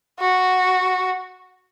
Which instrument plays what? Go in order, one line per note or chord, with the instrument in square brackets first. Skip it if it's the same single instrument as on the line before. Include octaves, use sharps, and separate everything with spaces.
[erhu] F#4